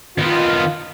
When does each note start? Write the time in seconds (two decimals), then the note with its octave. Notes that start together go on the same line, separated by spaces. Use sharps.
0.18 D#3 B3 F4